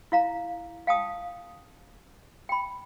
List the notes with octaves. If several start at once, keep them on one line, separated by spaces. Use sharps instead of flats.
E4 F5 A#5
F5 G5 A5 D#6
G5 B5